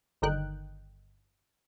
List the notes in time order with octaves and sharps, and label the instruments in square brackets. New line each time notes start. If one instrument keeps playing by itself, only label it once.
[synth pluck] G1 D3 D#3 D#4 G5 F#6